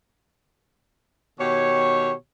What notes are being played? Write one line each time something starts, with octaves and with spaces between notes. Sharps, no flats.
B2 D#3 G4 C#5